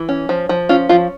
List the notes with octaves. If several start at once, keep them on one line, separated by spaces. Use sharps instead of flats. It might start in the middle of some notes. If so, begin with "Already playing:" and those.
Already playing: E3
C#4
F3
F3
C#4 F4
F3 F4